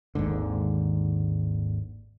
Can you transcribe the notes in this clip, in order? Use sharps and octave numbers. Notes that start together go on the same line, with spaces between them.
G#1 D#2 G#2 D3